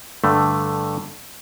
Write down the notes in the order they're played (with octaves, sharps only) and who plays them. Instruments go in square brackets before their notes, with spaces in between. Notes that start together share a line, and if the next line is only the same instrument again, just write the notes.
[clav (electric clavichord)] G2 D3 A3